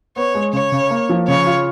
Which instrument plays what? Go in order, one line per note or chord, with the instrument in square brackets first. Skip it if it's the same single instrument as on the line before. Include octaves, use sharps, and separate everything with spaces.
[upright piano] B3 [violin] C#5
[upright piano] G#3
[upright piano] C#3 [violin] C#5
[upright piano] C#3
A#3
F3
[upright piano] C#3 [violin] C#5
[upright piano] F4